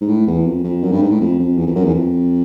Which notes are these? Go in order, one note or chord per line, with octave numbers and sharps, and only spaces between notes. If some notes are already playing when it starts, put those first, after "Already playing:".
G#2
A2
E2
F2
F2
F#2
G2
G#2
A2
F2
F2
E2
F2
F#2
E2
F2